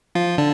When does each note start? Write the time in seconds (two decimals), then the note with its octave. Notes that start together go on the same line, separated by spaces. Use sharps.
0.15 F3 F4
0.38 D3 D4